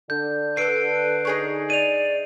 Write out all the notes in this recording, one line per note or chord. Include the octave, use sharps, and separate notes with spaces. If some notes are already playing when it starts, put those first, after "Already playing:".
D3 G6
A4 B4 E6 C7 D7
D#4 G#4 C#5
D5 D#7 F7